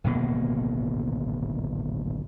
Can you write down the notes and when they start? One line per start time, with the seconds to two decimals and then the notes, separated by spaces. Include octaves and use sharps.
0.04 D1 G#1 B2 A#3